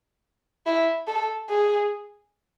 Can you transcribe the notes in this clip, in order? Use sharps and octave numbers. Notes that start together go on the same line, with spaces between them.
E4
A4
G#4